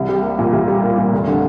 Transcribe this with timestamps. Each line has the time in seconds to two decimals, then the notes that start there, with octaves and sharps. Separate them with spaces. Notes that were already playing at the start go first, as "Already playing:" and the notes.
Already playing: C2
0.09 G3
0.23 A#3
0.39 A#2
0.53 C2
0.68 G3
0.83 A#3
0.98 A#2
1.13 F1
1.27 D3